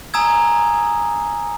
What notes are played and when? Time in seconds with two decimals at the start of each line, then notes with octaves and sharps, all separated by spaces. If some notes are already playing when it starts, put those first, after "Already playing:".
0.14 G#5 A#5 D#6 E6 G#6